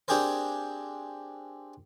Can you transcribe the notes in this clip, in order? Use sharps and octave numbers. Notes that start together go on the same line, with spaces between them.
C4 D4 G4 G#4 A#4 C5